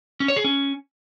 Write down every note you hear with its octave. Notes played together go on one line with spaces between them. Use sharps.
C#4
C#5
G#4
C#4